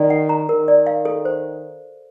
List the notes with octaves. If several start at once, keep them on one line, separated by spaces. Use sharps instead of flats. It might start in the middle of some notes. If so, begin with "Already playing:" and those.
Already playing: D#3 D5
F#5
A#5
D#3 A#4
D5
F5
A4
C5